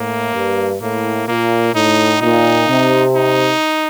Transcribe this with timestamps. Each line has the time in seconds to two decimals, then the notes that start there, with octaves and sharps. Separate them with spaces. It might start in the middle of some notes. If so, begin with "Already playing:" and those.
Already playing: A2 A#3
0.34 G2
0.81 A2 A#3
1.28 A#2 A#3
1.74 A2 D#4
2.21 A#2 D#4
2.68 C3
3.15 D#4